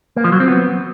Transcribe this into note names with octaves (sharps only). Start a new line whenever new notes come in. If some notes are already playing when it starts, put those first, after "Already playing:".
A#3
F3
F#3
C4
B3